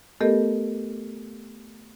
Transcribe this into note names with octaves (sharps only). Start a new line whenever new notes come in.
A3 B3 G4 A4 A#4 D#5